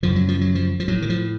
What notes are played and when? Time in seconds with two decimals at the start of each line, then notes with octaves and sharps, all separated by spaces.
0.03 F#2 C#3 F3
0.16 F#3
0.28 F3
0.41 F#3
0.55 F3
0.80 F3
0.88 A2 F#3
1.02 D#3
1.10 F3